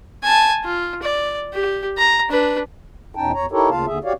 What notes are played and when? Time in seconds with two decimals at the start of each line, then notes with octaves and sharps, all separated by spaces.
0.23 G#5 A5
0.64 F4
1.02 D5
1.53 G4
1.97 A#5
2.29 D4 B4
3.15 E2 B2 C#4 D#4 G5 A5
3.34 E2 C#5 A#5
3.52 D#4 E4 G4 A4 A#4 C#5
3.70 D2 C#3 A#3 F4 F5 A5
3.87 D#2 D3 G#4 E5
4.04 F#4 G4 C#5 D5 F5